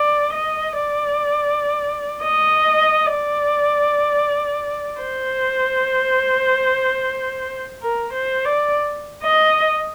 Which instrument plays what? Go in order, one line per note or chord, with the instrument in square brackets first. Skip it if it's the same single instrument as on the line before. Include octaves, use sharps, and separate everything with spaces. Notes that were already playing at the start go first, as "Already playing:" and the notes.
Already playing: [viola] D5
D#5
D5
D#5
D5
C5
A#4
C5
D5
D#5